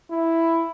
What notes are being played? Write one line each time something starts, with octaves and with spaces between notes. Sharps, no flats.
E4